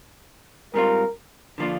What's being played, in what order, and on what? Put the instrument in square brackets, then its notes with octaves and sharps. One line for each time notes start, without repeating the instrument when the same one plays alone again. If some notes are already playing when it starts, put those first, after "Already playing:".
[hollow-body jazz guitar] G#2 G3 C4 F4 [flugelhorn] A#4
[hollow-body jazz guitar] D3 F3 A#3 D4 F4